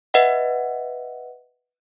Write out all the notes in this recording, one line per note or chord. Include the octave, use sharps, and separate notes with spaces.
B4 D#5 E5 F#5